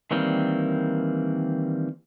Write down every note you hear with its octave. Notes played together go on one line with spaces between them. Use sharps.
D#3 E3 G3 A#3 C4